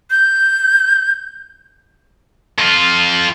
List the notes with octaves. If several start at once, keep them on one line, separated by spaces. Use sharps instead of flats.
G6
F2 F4